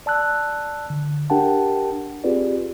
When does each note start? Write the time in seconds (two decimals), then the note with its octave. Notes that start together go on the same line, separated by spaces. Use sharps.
0.06 D5 A5 E6 F#6
0.90 D3
1.30 D4 G4 A#4 F#5 G5 A5
2.24 C4 F4 G4 G#4 B4 D5